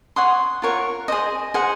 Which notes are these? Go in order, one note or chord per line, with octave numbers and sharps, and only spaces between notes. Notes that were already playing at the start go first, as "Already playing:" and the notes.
C#5 F#5 C6 D#6
F4 A#4 C#5 F#5
G#4 C5 D#5
G#4 C5 F#5